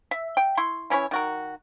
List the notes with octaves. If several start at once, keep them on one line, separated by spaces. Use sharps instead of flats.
E5
G5
E4 C6 C#6
E3 C#4 E4 C#5
D#3 F#4 A#4